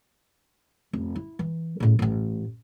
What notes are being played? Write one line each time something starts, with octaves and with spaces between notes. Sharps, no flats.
F1
E4
E3
A2 C#3
A1 A2